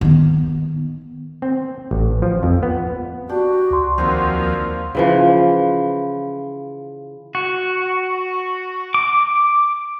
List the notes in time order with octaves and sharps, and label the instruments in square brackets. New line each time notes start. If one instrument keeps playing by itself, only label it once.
[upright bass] D#3 B3
[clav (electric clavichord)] C4
A1
F3
F2
B3
[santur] D4 G4 [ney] F#4
[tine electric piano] C#2 C6
[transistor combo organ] D#2 F3 [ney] A#3 [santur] C4 F#4 A#4
[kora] C#3 E3 F3
[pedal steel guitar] F#4
D6